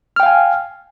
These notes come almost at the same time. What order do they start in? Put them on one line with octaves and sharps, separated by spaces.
F6 G5 F5 G#5